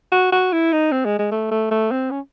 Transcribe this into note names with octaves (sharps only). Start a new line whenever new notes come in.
F#4
F#4
E4
D#4
C4
G#3
G#3
A3
A3
A3
C4
C#4